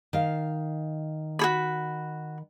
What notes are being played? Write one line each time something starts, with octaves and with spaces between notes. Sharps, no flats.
D#3 F5
F#4 G#4 B5